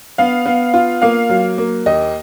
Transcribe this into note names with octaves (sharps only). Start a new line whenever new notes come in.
B3 F5
B3
F4
A#3 F5
F#3
A#3
D#2 D#5